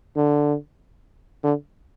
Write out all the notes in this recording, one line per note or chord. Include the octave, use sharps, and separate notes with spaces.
D3
D3